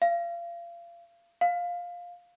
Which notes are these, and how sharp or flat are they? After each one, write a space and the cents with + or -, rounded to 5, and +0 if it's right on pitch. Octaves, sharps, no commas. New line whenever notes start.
F5 -30
F5 +10